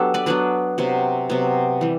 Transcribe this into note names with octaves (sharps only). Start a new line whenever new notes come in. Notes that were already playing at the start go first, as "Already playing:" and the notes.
Already playing: F#3 B3 D4 G4 A4
B4 D5
F#3 B3 D4 B4 D5
C3 F#3 B3
C3 F#3 B3
E3 G3